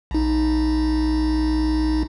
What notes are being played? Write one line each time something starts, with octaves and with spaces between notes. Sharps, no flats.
A#1 D#4